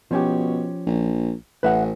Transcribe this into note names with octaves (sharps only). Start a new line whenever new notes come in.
B2 F3 C#4 G4
A#1
A1 B4 E5 F#5